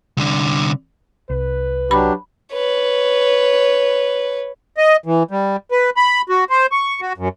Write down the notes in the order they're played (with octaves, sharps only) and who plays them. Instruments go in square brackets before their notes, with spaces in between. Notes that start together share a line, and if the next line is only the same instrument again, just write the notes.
[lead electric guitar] C2 D3
[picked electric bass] C2 [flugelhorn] B4
[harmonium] F#3 D4 G4 [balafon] B5
[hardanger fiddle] B4 C#5
[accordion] D#5
E3
G3
B4
B5
F#4
C5
C#6
F#4
F#2